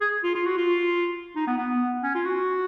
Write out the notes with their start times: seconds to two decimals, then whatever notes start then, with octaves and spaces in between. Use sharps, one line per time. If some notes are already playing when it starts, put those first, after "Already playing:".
0.01 G#4
0.23 F4
0.35 F4
0.46 F#4
0.58 F4
1.36 D#4
1.47 B3
1.58 B3
2.03 C#4
2.15 F4
2.25 F#4